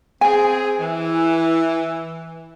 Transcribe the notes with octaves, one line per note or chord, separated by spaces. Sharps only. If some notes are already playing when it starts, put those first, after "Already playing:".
C4 G#4 G#5
E3